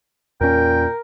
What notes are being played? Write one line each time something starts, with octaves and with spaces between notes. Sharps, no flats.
E2 A#2 C#4 A#4 G5